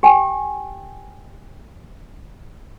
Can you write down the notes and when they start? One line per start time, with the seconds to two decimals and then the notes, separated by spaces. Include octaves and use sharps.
0.03 G4 G5 G#5